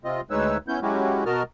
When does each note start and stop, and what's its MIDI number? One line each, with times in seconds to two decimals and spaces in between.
0.04 0.21 48
0.04 0.21 60
0.04 0.21 65
0.04 0.21 75
0.30 0.57 38
0.30 0.57 56
0.30 0.57 63
0.30 0.57 71
0.30 0.57 73
0.30 0.57 88
0.68 0.80 59
0.68 0.80 61
0.68 0.80 64
0.68 0.80 91
0.82 1.24 54
0.82 1.24 56
0.82 1.24 61
0.82 1.24 64
0.82 1.24 66
0.82 1.24 67
1.26 1.43 47
1.26 1.43 66
1.26 1.43 70
1.26 1.43 75
1.26 1.43 81
1.26 1.43 89